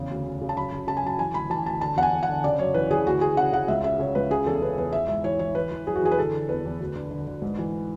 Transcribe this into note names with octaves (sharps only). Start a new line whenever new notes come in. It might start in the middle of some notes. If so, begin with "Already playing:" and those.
Already playing: E2 C#3
D2
D2
C#3
A5
F#2 B5
C#3
C#3 A5
G#5
F#2 A5
E3 G#5
D2 B5
E3 A5
D2 A5
D3 A5
E2 F#5
G#5
E2
F#5
D3
C#3 D5
F#2 C#5
E3 B4
E3 G#4
D2 F#4
D2 G#4
C#3 F#5
C#3 F#5
C#2 E5
C#3 E5
C#3 C#5
C#2 B4
C#3 G#4
E2 A4
C#3 B4
E2 B4
E3 E5
G#2 E5
E3 C#5
E3 C#5
E3 B4
E3
F#2 G#4
F#4
E3 G#4
B4
D3 A4
D3
E2 B4
E2
D2
D3
D3
D3
G#2
E3